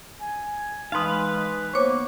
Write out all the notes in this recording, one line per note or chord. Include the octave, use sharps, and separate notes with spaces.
G#5
E3 G#3 D#4 B4 F5 C6 D#6
A#3 B3 C5 C#5 C#6 D6